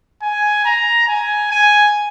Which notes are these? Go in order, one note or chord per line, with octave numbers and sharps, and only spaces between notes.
G#5
A#5
G#5
G#5